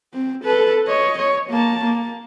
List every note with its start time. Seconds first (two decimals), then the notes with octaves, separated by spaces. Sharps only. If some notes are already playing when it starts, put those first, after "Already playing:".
0.14 C4
0.44 A4 B4
0.87 C#5 D#5
1.18 C#5
1.50 A#3 A5
1.85 A#3